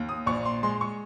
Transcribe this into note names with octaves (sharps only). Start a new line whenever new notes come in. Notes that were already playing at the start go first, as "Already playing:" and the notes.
Already playing: D#2
D#6
A#1 C#6
C6
G#3 C6
C#6